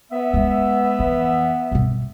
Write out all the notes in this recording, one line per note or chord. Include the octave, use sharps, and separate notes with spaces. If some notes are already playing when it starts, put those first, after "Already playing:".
B3 E5
G#3 C#4
F2 E3
G1 B2